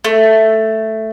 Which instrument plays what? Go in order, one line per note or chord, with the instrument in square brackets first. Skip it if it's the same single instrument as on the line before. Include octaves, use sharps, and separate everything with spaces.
[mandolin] A3